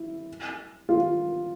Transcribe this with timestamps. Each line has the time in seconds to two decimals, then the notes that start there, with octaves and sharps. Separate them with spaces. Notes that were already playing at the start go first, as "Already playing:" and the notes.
Already playing: E4
0.89 F4